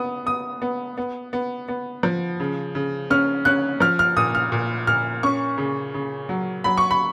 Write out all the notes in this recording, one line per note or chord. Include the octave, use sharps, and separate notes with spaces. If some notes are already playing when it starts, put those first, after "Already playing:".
Already playing: B3 D#6
B3 D#6
B3
B3
B3
B3
F3
C#3
C#3
C#4 F6
C#4 F#6
F3 F6
F6
A#2 D#6
F6
A#2
A#2 F6
C#4 C#6
C#3
C#3
F#3
F#3 B5
C#6
B5